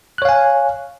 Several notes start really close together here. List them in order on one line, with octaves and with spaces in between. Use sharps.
F#6 C#5 F5 G#5